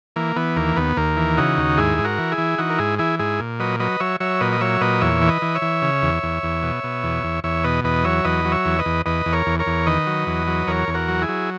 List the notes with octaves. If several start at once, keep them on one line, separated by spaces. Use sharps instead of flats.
E3 A#3
E3 B3
D#2 A#3
D#2 B3
D#2 A#3
E3
C#3 D#4 F#4
D#2
G#2 E4 G#4
G#2
F#4 A#4
E3
E4 G#4
E3
E3 D#4 F#4
A#4
G#2 E4 G#4
E3 E4 G#4
G#2 E4 G#4
A#2
F#3 B4 D#5
F#3 B4 D#5
F#3 C#5 E5
F#3 C#5 E5
A#2 B4 D#5
D#5
F#3 C#5 E5
A#2 B4 D#5
E2 C#5 E5
E3
B4 D#5
E3
C#5 E5
E3
C#3
E2
E2
E2
B2
B2
E2
E2
E2 C#5 E5
B2 B4 D#5
E2 B4 D#5
F#3 C#5 E5
E2 B4 D#5
F#3
C#5 E5
E2
B4 D#5
E2
E2 B4 D#5
E2
A#4 C#5
E2
A#4 C#5
E2
D#3 B4 D#5
F#3
E2
F#3
E2 A#4 C#5
E2
F#4 A#4
F#3
E4 G#4
F#3